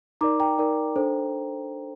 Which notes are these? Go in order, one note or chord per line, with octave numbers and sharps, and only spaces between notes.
D#4 A#4 D5 A#5 D6
G5 A#5
D#4 A#4 D5
D4 A4 C5